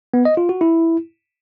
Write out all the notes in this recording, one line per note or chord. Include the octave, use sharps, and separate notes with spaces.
B3
D#5
F4
F#4
E4